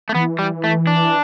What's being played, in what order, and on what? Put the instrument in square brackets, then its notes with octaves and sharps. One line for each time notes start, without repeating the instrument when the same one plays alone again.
[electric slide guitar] A3
[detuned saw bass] E3 [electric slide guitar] B3
[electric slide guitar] G3
A3
D4